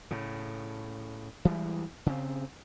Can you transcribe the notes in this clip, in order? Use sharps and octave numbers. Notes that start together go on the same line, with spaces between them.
A2 C#3
E3 G3 G#3
C#3 C4